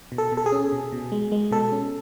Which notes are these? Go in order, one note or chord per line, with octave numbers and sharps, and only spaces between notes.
B2
A4
B2
A4
G#4
C#4
B2
B2
G#3
G#3
B2 A4
C#4